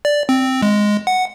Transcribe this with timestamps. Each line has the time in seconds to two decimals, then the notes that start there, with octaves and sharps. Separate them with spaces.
0.05 D5
0.29 C4
0.62 G#3
1.07 F#5